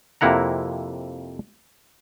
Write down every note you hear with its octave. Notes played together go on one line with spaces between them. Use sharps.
F2 C3 A#3 E4 F#5 A#5